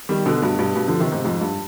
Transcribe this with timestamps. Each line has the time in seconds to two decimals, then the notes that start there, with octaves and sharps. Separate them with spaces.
0.09 D#3 G3
0.26 B2 D3
0.42 G2 B2
0.59 G2 B2
0.76 G2 B2
0.88 D3 F3
1.00 C3 D#3
1.12 G#2 C3
1.24 F2 G#2
1.41 G2